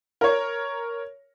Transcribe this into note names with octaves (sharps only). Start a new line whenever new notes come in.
A#4 C#5